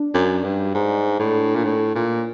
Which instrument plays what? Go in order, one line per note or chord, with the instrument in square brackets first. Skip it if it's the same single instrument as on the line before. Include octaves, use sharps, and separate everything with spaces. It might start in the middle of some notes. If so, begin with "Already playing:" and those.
Already playing: [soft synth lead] D4
[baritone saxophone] F#2
G2
G#2
A2
A#2
A2
A#2